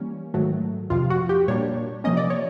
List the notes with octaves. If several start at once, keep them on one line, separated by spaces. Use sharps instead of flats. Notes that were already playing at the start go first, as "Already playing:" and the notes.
Already playing: E3 G3 A#3 C#4
G#2 D#3 F#3 A3
F2 C3 F3 F4
F#4
G4
A#2 G3 A#3 D4 C#5
C3 F3 A#3 C#4 D#5
D5
C#5